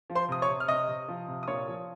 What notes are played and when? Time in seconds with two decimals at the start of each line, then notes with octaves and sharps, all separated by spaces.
0.10 F3
0.15 C5 C6
0.29 C3 D#6
0.42 C#5 C#6
0.49 C3
0.60 F6
0.68 C3 D#5 D#6
0.88 C3
1.08 F3
1.28 C3
1.43 D#6
1.48 A#2 C#5 C#6
1.67 F3